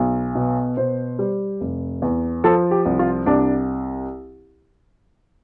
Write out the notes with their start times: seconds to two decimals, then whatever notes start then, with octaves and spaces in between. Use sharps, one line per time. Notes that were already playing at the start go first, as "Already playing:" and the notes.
Already playing: B1
0.35 B2
0.77 B2 C5
1.19 G3
1.61 F1
2.02 E2
2.44 F3 A4
2.71 G4
2.86 C2
2.99 F4
3.26 C2 D4